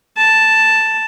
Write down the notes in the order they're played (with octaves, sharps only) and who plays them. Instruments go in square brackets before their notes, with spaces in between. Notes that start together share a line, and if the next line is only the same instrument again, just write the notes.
[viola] A5